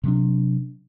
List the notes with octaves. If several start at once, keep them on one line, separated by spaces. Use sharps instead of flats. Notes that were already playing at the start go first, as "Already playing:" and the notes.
C3 F#3 C#4 D4